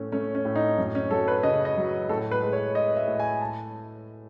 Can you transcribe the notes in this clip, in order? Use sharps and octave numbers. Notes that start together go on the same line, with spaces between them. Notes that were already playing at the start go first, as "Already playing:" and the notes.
Already playing: A2 A3 C#4
A3 C#4
C#4
A2
D#4
F#2
C#4
F#3 A4
B4
C#3 D#5
D#5
F#3
A2 A4
B4
G#3
C#5
G#3 D#5
E5
A2
G#5
A5